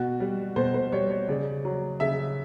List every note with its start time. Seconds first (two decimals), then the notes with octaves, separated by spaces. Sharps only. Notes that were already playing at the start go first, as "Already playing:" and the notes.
Already playing: B2 F#4
0.20 G3
0.56 B2 C5
0.74 C5
0.92 G3 C#5
1.10 C#5
1.29 C#3 D5
1.65 F#3
2.00 C#3 E5